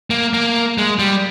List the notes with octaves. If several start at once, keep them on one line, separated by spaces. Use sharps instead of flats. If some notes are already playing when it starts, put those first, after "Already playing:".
A#3
A#3
G#3
G3